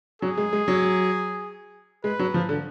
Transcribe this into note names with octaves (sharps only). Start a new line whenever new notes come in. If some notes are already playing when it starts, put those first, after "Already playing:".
F#3 G#4
G#3
G#3
F#3
G#3 B4
F#3
F3
D3